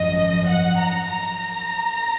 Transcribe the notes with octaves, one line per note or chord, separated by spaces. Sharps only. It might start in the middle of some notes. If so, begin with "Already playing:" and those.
Already playing: G#1 F#2 F3 D#5
F#5
A#5
A#5